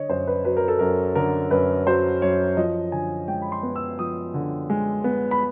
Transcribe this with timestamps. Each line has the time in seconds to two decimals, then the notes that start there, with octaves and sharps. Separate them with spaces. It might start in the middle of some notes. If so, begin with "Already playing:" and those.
Already playing: D3 C#5 D#5
0.09 F#2 C5
0.27 B4
0.45 F#3 B4
0.57 A#4
0.68 A4
0.79 F#2 A#4
1.15 D3 A#4
1.51 F#2 B4
1.86 F#3 C5
2.22 F#2 C#5
2.57 F3 D#5
2.92 D3 G#5
3.28 G#3 G5
3.42 B5
3.52 C6
3.63 B3
3.76 E6
3.99 F3 D#6
4.34 D3
4.70 G#3
5.04 B3
5.31 B5